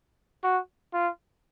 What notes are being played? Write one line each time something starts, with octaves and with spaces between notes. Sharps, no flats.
F#4
F4